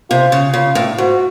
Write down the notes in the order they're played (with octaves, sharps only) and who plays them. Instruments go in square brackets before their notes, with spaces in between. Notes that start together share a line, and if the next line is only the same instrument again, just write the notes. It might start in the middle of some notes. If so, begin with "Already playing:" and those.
[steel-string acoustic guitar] C3 [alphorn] F4
[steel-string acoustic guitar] C#3
[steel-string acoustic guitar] C#3 [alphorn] F4
[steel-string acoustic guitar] A2
[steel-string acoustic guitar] G#2 [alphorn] F#4